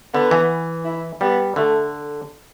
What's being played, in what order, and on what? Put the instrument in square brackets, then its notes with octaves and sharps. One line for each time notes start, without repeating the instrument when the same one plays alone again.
[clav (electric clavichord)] D3 [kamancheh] B3
[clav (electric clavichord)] E3
[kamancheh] E4
[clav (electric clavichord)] G3 [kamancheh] B3
[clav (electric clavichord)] D3 [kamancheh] A3